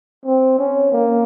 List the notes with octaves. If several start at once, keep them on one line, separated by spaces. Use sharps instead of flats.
C4
C#4
A#3